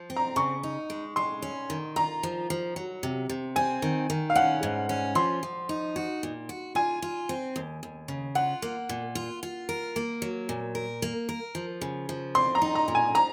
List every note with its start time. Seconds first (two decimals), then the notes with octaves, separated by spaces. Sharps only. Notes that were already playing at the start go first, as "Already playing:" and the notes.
Already playing: F3
0.10 C4
0.16 A#5
0.36 C#3 C#6
0.63 D#4
0.90 G#3
1.16 G#3 C6
1.42 C#4
1.70 D#3
1.96 F4 A#5
2.23 F3
2.50 F3
2.76 F#3
3.03 C3
3.29 C3
3.56 C4 G#5
3.82 D#3
4.10 D#3
4.30 F5
4.35 C#4 F#5
4.63 G#2
4.89 C#4
5.15 F3 C6
5.43 F3
5.69 D#4
5.96 F#4
6.23 A#2
6.49 F#4
6.75 F4 G#5
7.02 F4
7.29 C4
7.56 D#2
7.83 D#2
8.08 C#3
8.35 F4 F#5
8.62 A#3
8.89 A#2
9.15 F4
9.43 F4
9.69 A#4
9.96 A#3
10.22 F#3
10.49 A#2
10.75 A#4
11.02 A#3
11.29 A#4
11.55 F3
11.81 C#3
12.09 F3
12.35 C4 C6
12.55 A#5
12.62 D#4
12.75 A#5
12.88 A#2
12.95 G#5
13.15 F3 A#5